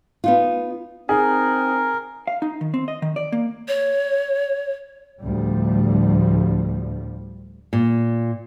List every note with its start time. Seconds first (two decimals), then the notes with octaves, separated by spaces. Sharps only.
0.24 B3 D#4 F4
1.09 C4 D#4 G#4 A#4
2.27 F5
2.42 D#4
2.61 D#3
2.74 C4
2.88 D#5
3.02 D#3
3.16 D5
3.32 A#3
3.68 C#5
5.21 D2 A2 F3 G3
7.73 A#2